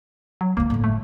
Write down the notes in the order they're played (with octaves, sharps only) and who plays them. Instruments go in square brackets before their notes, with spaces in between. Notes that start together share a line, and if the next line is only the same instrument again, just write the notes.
[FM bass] F#3
[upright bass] F3 A3 [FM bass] A#3
[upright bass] G1 A2
[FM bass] A3